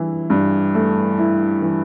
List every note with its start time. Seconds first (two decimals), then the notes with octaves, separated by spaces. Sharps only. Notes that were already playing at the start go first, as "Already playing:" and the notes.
Already playing: G2 E3 E4
0.30 G2
0.75 A3
1.18 E4
1.62 E3